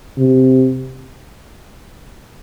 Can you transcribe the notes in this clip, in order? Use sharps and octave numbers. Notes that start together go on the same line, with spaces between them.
C3